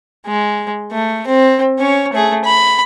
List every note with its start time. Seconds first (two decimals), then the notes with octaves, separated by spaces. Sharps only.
0.26 G#3
0.91 A3
1.27 C4
1.78 C#4 C#5
2.13 A3 G#4
2.44 B5